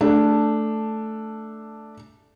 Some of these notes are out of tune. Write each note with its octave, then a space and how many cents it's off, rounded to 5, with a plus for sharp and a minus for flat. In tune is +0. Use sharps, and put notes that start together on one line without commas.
A3 +0 D4 +0